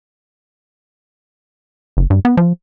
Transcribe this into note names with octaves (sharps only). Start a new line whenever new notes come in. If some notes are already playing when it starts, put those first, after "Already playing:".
F#1
G2
B3
F3